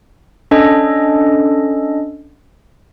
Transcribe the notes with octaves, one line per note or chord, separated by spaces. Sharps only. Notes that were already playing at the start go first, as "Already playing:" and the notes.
C#4 D4 A4 D#5